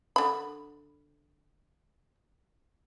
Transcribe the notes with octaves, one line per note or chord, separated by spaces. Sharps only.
D3 B5